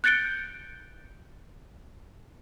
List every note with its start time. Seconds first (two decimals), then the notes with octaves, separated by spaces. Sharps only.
0.04 F#6 G6 A6 C#7 D7 G7